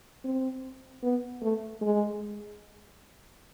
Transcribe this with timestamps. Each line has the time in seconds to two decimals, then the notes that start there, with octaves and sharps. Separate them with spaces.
0.25 C4
1.03 B3
1.42 A3
1.82 G#3